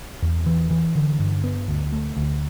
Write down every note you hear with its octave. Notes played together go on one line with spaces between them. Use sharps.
E2
E3
E3
D3
G2
B3
D2
A3
D2